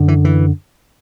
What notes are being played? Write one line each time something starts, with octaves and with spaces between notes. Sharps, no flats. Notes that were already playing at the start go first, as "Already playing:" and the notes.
Already playing: F#2 D3
E3
E3